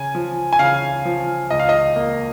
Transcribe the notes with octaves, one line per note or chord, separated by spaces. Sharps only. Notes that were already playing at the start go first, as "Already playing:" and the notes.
Already playing: C#3 G#5
F3
G#5
C#3 F5
F3
C#2 D#5
F5
D#5
A#3